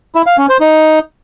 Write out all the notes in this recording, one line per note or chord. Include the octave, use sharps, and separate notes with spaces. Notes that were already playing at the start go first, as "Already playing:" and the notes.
E4
F5
C#4
C5
D#4